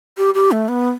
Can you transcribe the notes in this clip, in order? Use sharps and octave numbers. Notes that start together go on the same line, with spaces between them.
G4
G4
A3
B3